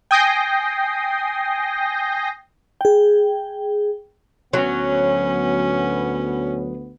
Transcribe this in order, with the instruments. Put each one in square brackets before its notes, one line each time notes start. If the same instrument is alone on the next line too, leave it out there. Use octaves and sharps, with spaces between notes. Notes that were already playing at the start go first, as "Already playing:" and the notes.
[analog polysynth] G5 G#5 D#6 G6 A#6 C7
[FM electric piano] G#4 G5
[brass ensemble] D2 B3 [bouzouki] F#3 [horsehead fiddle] C#4